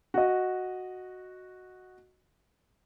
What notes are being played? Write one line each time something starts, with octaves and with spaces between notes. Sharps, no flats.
F#4 D#5